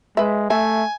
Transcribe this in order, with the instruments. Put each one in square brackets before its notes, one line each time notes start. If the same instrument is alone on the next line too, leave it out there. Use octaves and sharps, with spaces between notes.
[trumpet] G#3 [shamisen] B4 E5
[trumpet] A3 [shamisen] E5 [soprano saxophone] G#5